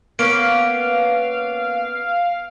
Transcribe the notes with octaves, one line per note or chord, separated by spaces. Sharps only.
A#3 B3 C#4 F5 D7